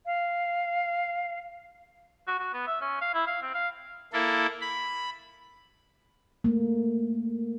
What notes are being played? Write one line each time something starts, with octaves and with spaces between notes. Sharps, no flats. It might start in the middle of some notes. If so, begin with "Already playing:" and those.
F5
F#4
F#4
B3
E5
C#4
F5
E4
F5
C4
F5
A#3 E4 A4
B5
A3 A#3